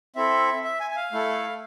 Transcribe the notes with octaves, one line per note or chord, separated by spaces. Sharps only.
C4 E4 A4 E5
E5
G#5
G#5
F5
A3 E4 A4